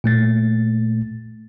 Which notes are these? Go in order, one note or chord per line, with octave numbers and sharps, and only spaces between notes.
A#2 A3 A6